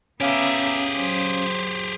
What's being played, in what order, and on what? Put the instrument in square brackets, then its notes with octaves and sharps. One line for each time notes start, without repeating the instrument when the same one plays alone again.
[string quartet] B3 E5 A#5 [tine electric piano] C#4 F5 D6 [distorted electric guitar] G4 G#4
[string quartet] F#3 C5